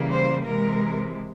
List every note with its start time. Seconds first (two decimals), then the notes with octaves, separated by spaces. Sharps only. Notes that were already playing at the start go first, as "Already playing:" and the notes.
Already playing: C#3 E3 G3 A#3
0.11 C5
0.45 C3 E3 G#3 A#4